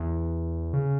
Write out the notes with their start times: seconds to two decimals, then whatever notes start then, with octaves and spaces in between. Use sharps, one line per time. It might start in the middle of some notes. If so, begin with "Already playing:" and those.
Already playing: E2
0.73 C#3